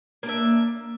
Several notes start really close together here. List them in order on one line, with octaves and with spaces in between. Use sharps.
A#3 D4 E5